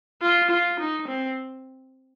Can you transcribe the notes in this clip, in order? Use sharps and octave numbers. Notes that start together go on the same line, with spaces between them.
F4
F4
D#4
C4